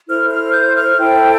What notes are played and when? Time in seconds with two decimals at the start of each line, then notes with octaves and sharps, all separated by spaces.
0.07 E4 A4 C5 F6
0.31 F6
0.52 G6
0.75 F6
0.96 E4 A4 C5 G5